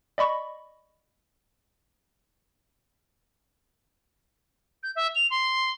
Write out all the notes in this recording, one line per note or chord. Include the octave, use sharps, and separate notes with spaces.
D5 D#5 B5 C#6
G6
E5
F7
C6